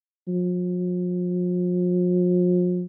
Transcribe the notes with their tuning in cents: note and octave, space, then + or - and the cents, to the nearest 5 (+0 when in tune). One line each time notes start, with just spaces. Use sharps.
F3 +45